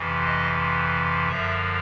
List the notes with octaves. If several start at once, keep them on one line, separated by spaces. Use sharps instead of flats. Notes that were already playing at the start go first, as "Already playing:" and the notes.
Already playing: F2 C3 E3
D#5
F#2 D3 F3 E5